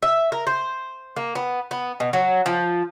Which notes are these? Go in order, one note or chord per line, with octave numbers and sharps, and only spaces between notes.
E5
A#4
C5
A#3
B3
B3
B2
F#3
F3